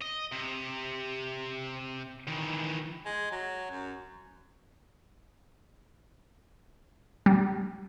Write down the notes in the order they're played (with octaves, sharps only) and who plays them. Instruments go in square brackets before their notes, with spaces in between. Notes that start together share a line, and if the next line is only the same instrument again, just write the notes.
[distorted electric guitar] D#5
C3
D#3 E3
[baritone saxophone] G#3
F#3
F#2
[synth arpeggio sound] G3